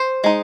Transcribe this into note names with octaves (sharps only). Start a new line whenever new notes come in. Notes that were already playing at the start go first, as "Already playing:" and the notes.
Already playing: C5
G#3 D#4